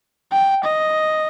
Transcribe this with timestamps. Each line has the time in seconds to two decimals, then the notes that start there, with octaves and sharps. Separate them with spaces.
0.32 G5
0.64 D#5